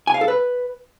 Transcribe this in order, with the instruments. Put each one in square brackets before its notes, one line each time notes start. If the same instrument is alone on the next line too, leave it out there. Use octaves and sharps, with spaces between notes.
[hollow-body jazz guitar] G#5
F5
A4
B4